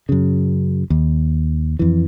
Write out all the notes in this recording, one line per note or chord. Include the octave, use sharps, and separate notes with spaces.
F#2 C#3
D#2
F2 E3